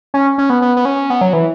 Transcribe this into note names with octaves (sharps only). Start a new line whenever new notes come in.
C#4
C#4
B3
B3
B3
C#4
B3
F#3
E3